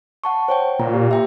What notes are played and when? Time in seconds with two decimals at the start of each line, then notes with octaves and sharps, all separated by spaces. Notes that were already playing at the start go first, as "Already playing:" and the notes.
0.24 F#5 A5 C#6
0.48 C5 C#5 G5
0.80 A#2 A#5
0.94 G4
1.11 E5 G5 A#5